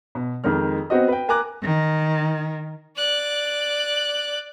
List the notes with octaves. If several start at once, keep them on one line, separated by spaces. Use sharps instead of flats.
B2
F2 D#3 G#3 F6
B3 C4 F#4 D#5
B4 G5
A#4 G#5 A#5 D6 F#6
D#3
D5 F#6